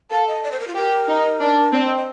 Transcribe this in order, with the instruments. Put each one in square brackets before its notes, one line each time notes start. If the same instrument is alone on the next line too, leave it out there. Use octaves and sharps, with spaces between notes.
[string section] A4 [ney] F5
[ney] D#5
D5
C5
A#4
F4
[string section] G4 [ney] A#4
[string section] D#4
D4
[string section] C4 [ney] D5
[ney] D#5
D#5